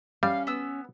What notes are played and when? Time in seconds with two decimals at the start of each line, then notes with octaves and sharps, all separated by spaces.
0.23 G3 C#4 F5
0.47 B3 E6